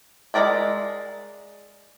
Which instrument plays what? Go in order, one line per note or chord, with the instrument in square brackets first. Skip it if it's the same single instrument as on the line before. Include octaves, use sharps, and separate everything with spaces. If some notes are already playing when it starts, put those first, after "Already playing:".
[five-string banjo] G#3 A4 A#4 D5 E5